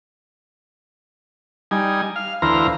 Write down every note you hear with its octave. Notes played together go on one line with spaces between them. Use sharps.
G3 D#4 G#5
F5
D2 E3 C5 F5 A#5